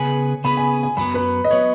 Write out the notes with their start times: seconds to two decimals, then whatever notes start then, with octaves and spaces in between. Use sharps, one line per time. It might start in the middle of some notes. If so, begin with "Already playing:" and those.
Already playing: C#3 B3 G#4 B4 G#5
0.44 C#3 B3 G#4 B4 B5
0.57 G#5
0.83 G#5
0.97 F#2 F#3 B3 B5
1.14 B4
1.44 D#5
1.51 F#3 B3 C#5